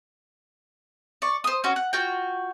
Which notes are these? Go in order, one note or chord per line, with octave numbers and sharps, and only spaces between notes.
D5 C#6
C5 D#6
C#4 F#4
F#5
F4 F#4 G5